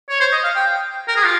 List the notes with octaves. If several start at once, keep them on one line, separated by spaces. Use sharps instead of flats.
C#5
C5
D#5
F5
G5
A#4
G#4
F4